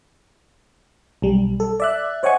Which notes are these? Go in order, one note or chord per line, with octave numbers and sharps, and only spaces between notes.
B1 G3
A4
D5 E5 F#6
C5 C#5 D#5 F#5 G#5 C#6